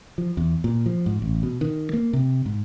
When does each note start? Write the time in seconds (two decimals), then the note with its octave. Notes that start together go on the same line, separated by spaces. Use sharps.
0.18 F3
0.37 E2
0.64 A#2
0.86 F3
1.06 G#2
1.22 A1
1.43 B2
1.61 D#3
1.93 A#3
2.13 C3
2.46 G#2